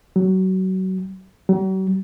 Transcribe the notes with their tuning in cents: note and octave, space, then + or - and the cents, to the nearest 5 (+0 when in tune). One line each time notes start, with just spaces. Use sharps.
F#3 +25
F#3 +45